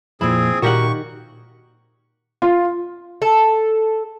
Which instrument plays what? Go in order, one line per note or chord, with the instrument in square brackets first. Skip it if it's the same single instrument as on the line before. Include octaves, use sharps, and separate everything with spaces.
[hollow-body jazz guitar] F2 A#2 [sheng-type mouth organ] C4 G#4 [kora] E4
[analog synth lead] A#2 [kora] D#3 G4 F#5 [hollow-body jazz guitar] F#4 A#4 [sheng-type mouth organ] C#6
[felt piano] F4
[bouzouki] A4